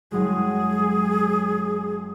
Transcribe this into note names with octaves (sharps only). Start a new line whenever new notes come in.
F#1 F#3 G#3 G#4